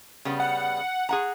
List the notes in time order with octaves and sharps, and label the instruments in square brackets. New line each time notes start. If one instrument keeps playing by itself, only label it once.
[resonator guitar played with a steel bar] C#3 G3 B3
[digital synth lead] F#5
[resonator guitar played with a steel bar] G#4 F#5 A#5